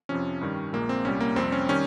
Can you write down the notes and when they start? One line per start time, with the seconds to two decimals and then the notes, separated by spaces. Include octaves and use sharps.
0.09 F2 C3 F3 C#4
0.41 G2 D#3 G3
0.73 A#1 A#2 G#3 A#3
0.89 C4
1.05 C2 A#2 G3 C#4
1.21 A#3
1.36 F2 C3 G3 C4
1.52 C#4
1.69 D#3 G3 C#4